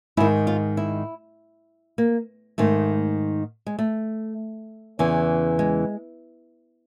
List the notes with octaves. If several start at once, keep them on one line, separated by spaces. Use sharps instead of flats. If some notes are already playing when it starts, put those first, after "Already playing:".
G#2 D#3 E4
F4
E4
A#3
G#2 D#3 A3
G#3
A3
E2 C#3 E3
G#3